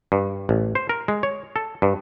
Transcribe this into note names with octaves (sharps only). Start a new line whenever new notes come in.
G2
A1
C5
A#4
G#3
C#5
A4
G2